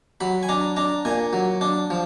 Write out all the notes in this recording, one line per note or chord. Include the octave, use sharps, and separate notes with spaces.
F#3 B5
G#5
D4 A#5
D4 A#5
A#2 G#5
F#3
D4
F3